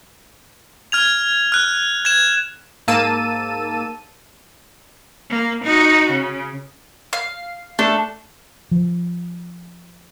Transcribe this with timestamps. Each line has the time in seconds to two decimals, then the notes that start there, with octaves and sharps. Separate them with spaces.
0.92 F6 G#6 F7
1.52 F6 F#6
2.05 G#6 E7
2.88 G#2 A#3 A5 E6 D#7
5.30 A#3
5.64 D#4 F#4
6.10 C#3
7.13 F5
7.79 A3 D4 A4
8.71 F3